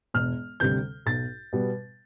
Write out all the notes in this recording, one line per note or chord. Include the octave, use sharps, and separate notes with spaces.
E1 F6
D2 C3 G3 C4 G6
B1 A6
B2 G3 B3